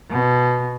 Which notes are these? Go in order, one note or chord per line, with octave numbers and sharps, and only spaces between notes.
B2